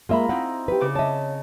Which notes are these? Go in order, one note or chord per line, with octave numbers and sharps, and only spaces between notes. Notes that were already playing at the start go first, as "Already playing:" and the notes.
G#3 A#3 F4 E5 A#5 B5
C4 D#4 E4 F#5
G4 B4
C#3 D6
C#5 D#5 E5 A5